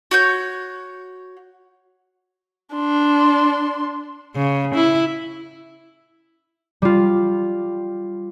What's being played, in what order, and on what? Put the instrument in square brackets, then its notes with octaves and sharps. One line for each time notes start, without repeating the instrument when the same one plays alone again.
[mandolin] F#4 C#5 G6
[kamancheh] D4 C6
[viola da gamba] C#3
E4
[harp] G3 F4